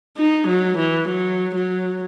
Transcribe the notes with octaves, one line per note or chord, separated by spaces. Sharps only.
D#4
F#3
E3
F#3
F#3